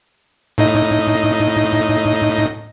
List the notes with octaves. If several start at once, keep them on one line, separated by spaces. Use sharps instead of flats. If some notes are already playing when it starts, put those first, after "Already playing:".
A2 D#4 D#5